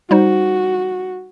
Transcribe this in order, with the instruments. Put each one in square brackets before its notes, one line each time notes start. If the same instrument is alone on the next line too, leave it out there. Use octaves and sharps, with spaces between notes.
[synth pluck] G3 D#4 C5 [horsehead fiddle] F#4